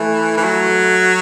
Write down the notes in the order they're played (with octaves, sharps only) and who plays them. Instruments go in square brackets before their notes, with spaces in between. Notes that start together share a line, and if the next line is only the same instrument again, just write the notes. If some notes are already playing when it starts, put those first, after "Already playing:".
Already playing: [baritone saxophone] E3 [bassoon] A3
[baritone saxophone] E3
F#3